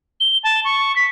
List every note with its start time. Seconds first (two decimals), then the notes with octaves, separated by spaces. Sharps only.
0.20 G7
0.44 A5
0.65 C#6
0.96 B6